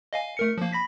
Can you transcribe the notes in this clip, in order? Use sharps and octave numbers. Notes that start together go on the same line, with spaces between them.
D#5 F5 G#5
A3 A#4 C#7
F3 A#3
B5 A#6 B6